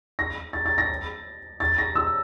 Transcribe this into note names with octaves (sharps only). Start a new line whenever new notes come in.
A#6
A6
A6
A#6
A6
A#6
E6